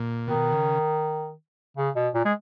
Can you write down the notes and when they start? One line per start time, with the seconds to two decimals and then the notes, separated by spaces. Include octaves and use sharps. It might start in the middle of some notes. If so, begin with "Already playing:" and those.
Already playing: A#2
0.27 B2 D#3
0.52 C#3
1.77 C#3
1.96 B2
2.14 A#2
2.25 G#3